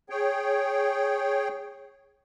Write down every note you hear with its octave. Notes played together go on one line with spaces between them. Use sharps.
G#4 C#5 G5